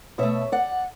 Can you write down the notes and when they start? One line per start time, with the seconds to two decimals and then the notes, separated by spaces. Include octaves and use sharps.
0.18 B2 A3 C#5 E5
0.52 D5 F#5